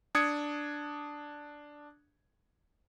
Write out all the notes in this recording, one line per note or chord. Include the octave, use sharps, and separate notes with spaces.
D4 D#6 G#6 C#7